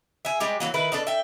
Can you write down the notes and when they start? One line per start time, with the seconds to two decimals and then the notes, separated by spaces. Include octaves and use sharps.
0.25 G#4 E5
0.40 G3 G#3 G4
0.60 E3 F#3 A#3
0.74 D#3 E4 B4
0.92 B2 D4 A4
1.07 E5 G5